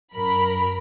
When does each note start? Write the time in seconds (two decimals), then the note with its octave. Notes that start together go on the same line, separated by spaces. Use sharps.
0.14 F#2 A#4 B5